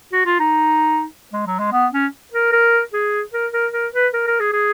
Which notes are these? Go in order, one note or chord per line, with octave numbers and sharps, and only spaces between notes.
F#4
F4
D#4
G#3
F#3
G#3
B3
C#4
A#4
A#4
G#4
A#4
A#4
A#4
B4
A#4
A#4
G#4
G#4